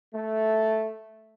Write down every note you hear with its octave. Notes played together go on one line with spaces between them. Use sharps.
A3